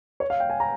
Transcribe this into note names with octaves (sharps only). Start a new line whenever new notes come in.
C#5
F5
G5
G#5
A#5